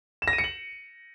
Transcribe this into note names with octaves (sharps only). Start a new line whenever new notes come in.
E7
A#6
D#7
C#7
F#7